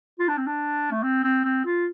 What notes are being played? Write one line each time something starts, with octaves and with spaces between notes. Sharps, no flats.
F4
D4
C4
D4
A3
C4
C4
C4
F4